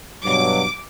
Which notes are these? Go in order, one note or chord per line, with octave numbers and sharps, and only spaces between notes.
G2 B2 F#3 D6